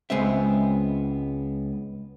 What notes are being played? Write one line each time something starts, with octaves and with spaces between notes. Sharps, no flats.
C#2 G#3 B3 C4 E5